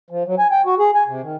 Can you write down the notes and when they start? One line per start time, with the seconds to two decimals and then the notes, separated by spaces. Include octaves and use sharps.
0.10 F3
0.26 F#3
0.39 G#5
0.51 G5
0.66 F#4
0.79 G#4
0.95 G#5
1.08 C3
1.22 D#3